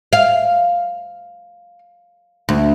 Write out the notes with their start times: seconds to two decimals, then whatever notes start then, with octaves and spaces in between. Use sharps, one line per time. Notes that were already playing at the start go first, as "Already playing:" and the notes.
0.13 F5
2.49 D2